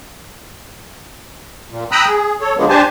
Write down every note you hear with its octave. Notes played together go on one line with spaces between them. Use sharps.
A#2
G5 A#5 B5 D#6 E6 F#6
G#4
A4 C#5
D3 F3 F#3 G#3 A#3 B3
D4 G4 C5 G#5 A5